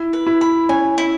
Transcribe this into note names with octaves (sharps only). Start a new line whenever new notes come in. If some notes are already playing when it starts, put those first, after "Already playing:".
Already playing: E4
B4
E4
B5
C#4 G#5
E4